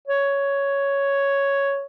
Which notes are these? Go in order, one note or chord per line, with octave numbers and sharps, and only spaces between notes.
C#5